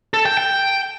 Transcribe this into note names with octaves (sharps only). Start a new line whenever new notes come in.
A4
G5
G5